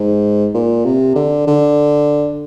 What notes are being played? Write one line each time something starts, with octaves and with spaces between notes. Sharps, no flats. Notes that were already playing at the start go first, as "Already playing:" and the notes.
Already playing: G#2
A#2
C3
D3
D3